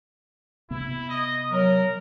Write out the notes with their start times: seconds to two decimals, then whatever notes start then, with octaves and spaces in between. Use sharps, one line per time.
0.71 C3 B3 E4
1.10 D#5
1.51 F#3 A#4